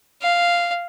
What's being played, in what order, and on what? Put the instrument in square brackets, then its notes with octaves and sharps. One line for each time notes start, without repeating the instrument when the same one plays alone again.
[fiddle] F5